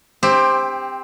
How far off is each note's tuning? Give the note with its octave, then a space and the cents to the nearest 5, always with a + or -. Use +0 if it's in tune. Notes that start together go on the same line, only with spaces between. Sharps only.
C4 +0 G4 +25